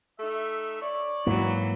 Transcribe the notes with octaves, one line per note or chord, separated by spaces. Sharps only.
A3 D#4 E5
C#5 D5
G#2 E3 F#3 A#3